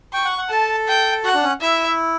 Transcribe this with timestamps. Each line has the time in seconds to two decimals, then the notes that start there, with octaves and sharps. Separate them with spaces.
0.13 G5 C#6
0.25 F#5
0.38 F#5
0.50 A4 A5
0.88 G5
1.24 F#4 F#5
1.34 D4
1.43 C#4
1.61 E4 E5